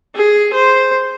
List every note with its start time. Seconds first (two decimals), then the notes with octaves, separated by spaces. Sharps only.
0.15 G#4
0.53 C5